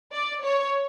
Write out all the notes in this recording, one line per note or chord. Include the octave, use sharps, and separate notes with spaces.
D5
C#5